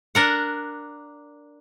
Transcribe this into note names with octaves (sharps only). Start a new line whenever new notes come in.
D4 A#4 F#5